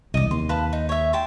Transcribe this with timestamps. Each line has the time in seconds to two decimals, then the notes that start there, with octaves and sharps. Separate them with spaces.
0.14 E1 C2 D5 D#5
0.31 D#2 C6
0.49 B4 F5 A5
0.73 D#4
0.89 C#5 E5
1.13 G5 A5 C6